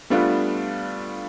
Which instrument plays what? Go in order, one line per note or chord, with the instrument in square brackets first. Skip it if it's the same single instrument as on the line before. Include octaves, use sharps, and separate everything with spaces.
[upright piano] G3 A3 B3 D4 F4